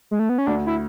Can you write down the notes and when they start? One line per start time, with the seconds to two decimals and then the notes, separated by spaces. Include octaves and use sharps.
0.11 G#3
0.19 A3
0.29 B3
0.38 C#4
0.46 D2 D4
0.66 E4